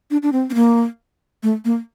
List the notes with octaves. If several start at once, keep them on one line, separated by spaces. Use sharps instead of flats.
D4
D4
C4
C4
A#3
A3
A#3